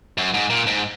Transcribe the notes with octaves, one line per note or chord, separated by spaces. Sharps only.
F#2
G#2
A#2
G#2